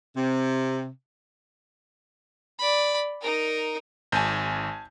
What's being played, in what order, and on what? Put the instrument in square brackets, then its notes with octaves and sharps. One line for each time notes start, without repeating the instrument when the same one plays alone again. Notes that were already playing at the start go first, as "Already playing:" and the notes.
[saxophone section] C3
[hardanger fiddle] D5 B5
D#4 A#4
[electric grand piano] G#1 [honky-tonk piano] G#5 A5 G6